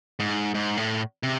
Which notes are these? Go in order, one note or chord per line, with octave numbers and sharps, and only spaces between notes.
G#2
G#2
A2
C3